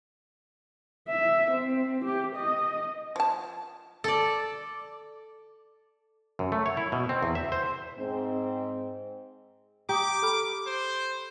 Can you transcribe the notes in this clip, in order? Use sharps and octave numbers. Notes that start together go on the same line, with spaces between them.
E5
C4
G4
D#5
F3 A5
A4 D5
F#2
A3
C#5
E4
B2
C4
E2
E5
C5
G#2 C4
G4 A#5 D6 D#6
A4 B5 F6
C5